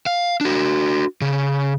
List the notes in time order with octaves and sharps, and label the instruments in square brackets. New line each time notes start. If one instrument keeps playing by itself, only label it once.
[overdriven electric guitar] F5
D4 F#4
C#3